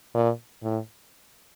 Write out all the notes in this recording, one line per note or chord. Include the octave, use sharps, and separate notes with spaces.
A#2
A2